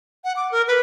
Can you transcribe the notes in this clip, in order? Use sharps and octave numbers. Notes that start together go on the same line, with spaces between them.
F#5
D6
A#4
B4